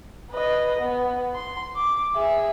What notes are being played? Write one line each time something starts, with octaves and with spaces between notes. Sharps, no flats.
B4 D#5
B3
C6
D6
G#4 E5